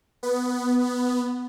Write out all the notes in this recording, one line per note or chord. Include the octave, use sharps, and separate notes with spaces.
B3